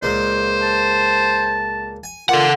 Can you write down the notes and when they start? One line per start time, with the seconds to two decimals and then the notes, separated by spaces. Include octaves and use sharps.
0.03 C#2 A#2 G#3 C5
0.62 A5
2.04 G#5
2.29 A#3 F4 A4 F#5